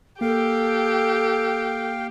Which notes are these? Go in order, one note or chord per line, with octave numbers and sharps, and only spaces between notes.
A#3 G4 A4 F5 G5